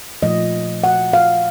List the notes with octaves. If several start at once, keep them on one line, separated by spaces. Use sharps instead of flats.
A#2 F3 A3 D#5
F#5
F5